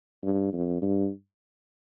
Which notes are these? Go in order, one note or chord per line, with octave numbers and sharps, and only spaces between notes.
G2
F2
G2